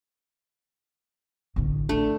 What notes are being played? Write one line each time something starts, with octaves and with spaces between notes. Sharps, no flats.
A1 D3
A3 D4